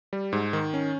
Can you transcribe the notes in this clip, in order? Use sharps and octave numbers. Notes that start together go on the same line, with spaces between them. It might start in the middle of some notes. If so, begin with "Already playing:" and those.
G3
G#2
D#3
C#4